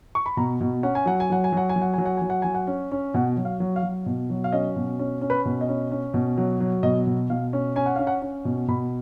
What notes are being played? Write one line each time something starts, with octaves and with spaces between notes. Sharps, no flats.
C#6
B5
B2 A#5
B2
C#4 F#5
G#5
F#3 F#5
G#5
F#3 F#5
G#5
F#3 F#5
G#5
F#3
F#5
F#3 G#5
F#5
F#3 G#5
F#5
F#3 G#5
F#5
C#4
C#4
B2 F#5
F#3
F5
F#3
F5
F#3
B2
F#3
F5
C#4 D#5
B2
C#4
C#4
B4
B2
D#5
C#4
C#4
B2
F#3
F#3
B2 D#5
B2
B2 F5
C#4
C#4 G#5
F#5
C#4 F5
F#5
C#4
B2
B2 B5